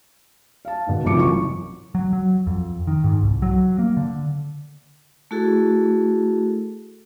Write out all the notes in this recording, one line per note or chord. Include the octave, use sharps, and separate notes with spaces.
F5 A5
G#2 B2
F#1 B1 C3 F3 D6 C#7
A1 F#2 C#6
F#3
F#3
F2
D#3
G#2
C2
F#3
A#3
D3
A3 E4 F#4 G#4 A4